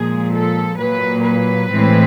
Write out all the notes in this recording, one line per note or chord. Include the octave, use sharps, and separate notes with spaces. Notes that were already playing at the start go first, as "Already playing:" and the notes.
Already playing: A#2 F3 G#3 G#4
A4
A#2 F#3 A#3 B4
B4
A2 E3 G#3 C4